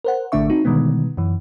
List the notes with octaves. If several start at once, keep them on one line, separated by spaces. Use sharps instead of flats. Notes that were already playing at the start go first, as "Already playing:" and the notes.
A#4 C5 F#5
A1 D3 A3 D4 E5 C#6
C4 D#4 F#4
B2 D3 D#3 G3 G#3 B3
F#2 E3